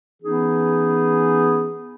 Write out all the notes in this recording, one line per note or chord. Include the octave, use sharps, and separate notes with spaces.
E3 B3 C#4 D#4 G#4